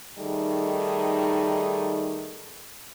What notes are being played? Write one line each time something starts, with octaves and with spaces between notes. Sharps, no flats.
D#3 G3 A3 D#4 G#4